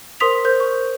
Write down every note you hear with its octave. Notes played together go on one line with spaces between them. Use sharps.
A#4 C5 C6 D#6 B6 F7
A#4 C5 G6
C#6